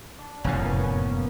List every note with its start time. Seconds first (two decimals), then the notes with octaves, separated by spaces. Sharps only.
0.19 D4
0.44 F1 F#2 A2 A#3 B3 C#4